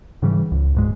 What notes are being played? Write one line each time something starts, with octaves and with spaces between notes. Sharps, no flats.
G#2 C#3 E3 G3
C#2
D1 G#2 G#3